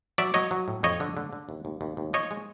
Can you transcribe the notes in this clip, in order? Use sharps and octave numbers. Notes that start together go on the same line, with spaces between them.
F#3 D5 E5
F#3 C#5 D#5
F#3
A2
F2 C#5 D#5
D3
D3
D3
D#2
D#2
D#2
D#2
F3 C#5 D#5
G#3